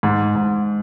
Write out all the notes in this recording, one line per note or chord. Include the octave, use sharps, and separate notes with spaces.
G#2
G#2